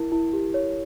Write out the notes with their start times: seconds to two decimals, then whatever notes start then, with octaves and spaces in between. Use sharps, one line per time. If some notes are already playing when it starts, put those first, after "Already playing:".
Already playing: E4 A#4
0.12 E4
0.33 G4
0.54 C#5